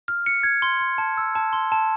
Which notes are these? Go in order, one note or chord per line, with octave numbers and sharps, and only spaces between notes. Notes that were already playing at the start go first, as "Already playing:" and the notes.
F6
C#7
G#6
C6
C6
A5
E6
A5
C6
A5